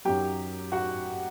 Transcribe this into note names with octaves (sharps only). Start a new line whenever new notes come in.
F#2 D#3 F#3 G4 G5
F#4 F#5